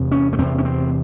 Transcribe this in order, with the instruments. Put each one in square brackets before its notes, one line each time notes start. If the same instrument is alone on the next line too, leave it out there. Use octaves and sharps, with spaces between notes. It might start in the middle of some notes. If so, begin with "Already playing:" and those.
Already playing: [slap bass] E2 C3
C#4
A3
E2 C3 C4
C#4
C4